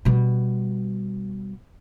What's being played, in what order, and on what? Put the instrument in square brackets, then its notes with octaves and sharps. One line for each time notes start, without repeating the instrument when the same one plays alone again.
[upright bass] B2 G3